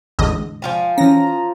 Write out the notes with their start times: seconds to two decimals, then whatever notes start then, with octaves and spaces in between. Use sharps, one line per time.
0.19 A1 E2 D3 G#3 D#5
0.62 F3 F4 G#5
0.98 E3 C#4 A#5 A#6